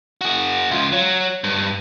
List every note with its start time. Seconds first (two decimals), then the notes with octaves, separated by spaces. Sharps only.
0.21 F#4 G#4
0.71 C#2 F4
0.93 F#3
1.44 G2